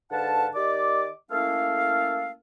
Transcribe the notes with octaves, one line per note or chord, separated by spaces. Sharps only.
G#2 D3 B4 F5 F#5 A5
D#3 G4 D5 D#5 D6
A3 A#3 C#4 E4 A4 F5